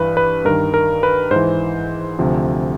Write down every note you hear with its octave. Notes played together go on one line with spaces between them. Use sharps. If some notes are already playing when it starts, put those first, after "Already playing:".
Already playing: G2 E3 B4
B4
G2 D#3 A#4
A#4
B4
G#2 E3 C5
D2 C3 F3